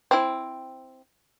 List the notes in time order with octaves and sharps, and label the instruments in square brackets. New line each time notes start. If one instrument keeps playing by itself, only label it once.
[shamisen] C4 E4